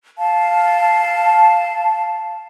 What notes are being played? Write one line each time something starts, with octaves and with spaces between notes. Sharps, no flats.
F5 A5